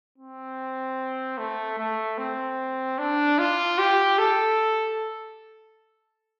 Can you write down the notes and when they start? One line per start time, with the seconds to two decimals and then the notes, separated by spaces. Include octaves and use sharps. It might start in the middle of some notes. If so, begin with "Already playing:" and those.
0.18 C4
1.38 A3
1.78 A3
2.18 C4
2.98 D4
3.39 F4
3.79 G4
4.18 A4